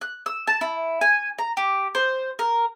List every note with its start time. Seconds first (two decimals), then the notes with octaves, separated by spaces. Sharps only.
0.01 F#6
0.26 E6
0.47 A5
0.61 E4
1.01 G#5
1.39 A#5
1.57 G4
1.95 C5
2.39 A#4